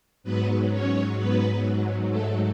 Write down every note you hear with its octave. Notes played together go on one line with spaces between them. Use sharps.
G#2 F#3 B3 B4
C#4 C#5
B3 B4
A3 A4